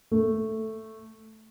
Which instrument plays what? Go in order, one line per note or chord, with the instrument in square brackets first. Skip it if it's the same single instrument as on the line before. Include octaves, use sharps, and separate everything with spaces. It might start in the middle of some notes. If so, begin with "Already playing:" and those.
[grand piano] A3